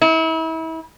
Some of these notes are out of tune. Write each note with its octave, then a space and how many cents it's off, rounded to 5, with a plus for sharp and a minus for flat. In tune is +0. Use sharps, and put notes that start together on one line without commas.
E4 -35